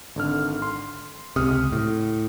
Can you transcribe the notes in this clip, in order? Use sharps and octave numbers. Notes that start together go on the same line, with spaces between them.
G#1 D3 F6
C6
C#2 C3 D#6 F6
A2